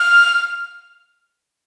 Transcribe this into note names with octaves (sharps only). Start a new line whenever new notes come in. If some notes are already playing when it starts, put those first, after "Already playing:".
Already playing: F6